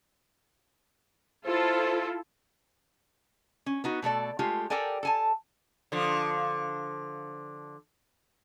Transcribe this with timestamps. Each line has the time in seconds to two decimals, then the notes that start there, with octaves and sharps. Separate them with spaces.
1.46 E4 F4 A4 C5
3.66 C#4
3.84 B3 D#4 F#4
4.02 B2 A3 A4 D5
4.39 G#3 A3 F4 G4
4.70 G4 A4 A#4 D5 G5 G#5
5.03 A4 G#5 A5
5.92 D3 F3